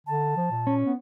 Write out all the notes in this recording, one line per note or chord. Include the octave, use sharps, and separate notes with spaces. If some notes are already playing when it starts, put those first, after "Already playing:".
D3 A5
F3
A#2
C#4
B3